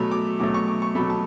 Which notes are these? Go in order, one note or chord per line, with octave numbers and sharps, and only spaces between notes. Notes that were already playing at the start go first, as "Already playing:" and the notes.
Already playing: B2 F#3 A3 B5
D6
B2 F#3 A3 D6
C#6
D6
C#6
B2 F#3 A3 B5
A5